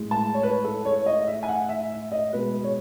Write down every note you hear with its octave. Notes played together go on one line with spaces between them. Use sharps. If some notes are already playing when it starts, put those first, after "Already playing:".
Already playing: A2 G#3
A5
C#5
B4
A4
C#5
D#5
D#5
E5
G#5
F#5
E5
E5
D#5
B2 G#3 B4
C#5